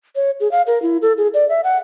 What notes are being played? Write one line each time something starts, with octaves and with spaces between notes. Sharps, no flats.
C#5
G#4
F5
A#4
E4
A4
G#4
D5
E5
F#5